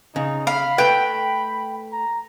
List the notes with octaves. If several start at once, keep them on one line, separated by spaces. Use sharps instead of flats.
C#3 D#4
F5 B5
A3 B4 G5
A#5